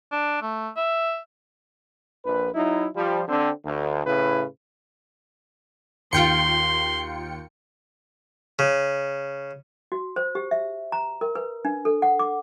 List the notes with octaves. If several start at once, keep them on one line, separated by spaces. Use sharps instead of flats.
D4
A3
E5
A#1 B4
F#3 D#4 E4
F3 G3
D3 C4
D2
A2 C#3 E4 B4
D#2 F4 G5 C6 C#7
C#3
F#4
C5
G4
E5
A#5
A#4
B4
D4
A4
F#5
D6